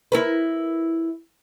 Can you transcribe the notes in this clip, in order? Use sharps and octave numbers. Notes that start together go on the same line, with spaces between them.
E4 A#4 B4